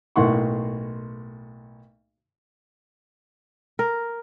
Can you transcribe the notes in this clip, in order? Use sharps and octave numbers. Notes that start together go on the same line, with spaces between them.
B1 A2 A#3 F#5 C6 C#6
A#4